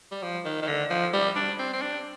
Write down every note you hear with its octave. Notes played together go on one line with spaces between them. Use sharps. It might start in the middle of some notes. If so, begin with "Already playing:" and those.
G3
F3
D#3
D#3
D3
F3
G3
D4
C4
C4
D4